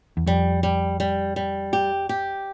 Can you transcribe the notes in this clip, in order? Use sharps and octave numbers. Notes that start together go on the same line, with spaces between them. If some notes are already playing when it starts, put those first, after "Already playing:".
E2
F2 G3
G3
G3
G3
G4
G4